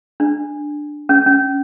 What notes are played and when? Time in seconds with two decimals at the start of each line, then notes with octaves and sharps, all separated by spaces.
0.20 D4
1.09 C#4
1.26 C#4